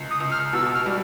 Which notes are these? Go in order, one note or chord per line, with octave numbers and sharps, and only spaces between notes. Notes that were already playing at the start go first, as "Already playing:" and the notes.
Already playing: C#2
D#6
C#2
F6
B2 E6
F6
G3